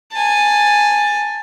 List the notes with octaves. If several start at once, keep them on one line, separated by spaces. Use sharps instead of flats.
G#5 A5